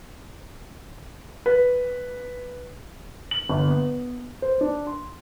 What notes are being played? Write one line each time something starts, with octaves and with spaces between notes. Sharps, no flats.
B4
F#7
G1
B3
C5
D4
C6